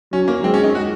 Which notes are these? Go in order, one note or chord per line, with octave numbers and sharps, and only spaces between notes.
F#3 C#4
A#3
G#3 C4
C#4
D#4
F#4